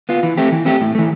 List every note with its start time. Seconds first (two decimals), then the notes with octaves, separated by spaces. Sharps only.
0.09 B3 F4
0.23 E3
0.37 A3 C4 G4
0.52 E3
0.65 A3 C4 G4
0.81 A2
0.95 E3 A3